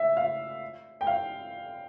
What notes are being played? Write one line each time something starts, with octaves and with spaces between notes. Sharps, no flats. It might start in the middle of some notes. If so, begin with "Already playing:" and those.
Already playing: E5
F5
G5
F5